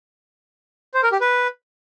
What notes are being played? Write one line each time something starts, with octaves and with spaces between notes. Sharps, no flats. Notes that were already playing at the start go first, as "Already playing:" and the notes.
C5
A#4
G4
B4